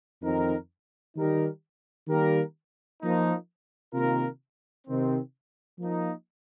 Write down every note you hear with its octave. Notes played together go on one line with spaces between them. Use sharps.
F2 D#3 C4 D#4 A#4
D#3 G3 D#4 G4 A#4
D#3 G3 A#3 G4 A#4
F3 A#3 D#4
C3 D#3 A#3 F4 A#4
C3 D#3 C4
F3 A#3 D#4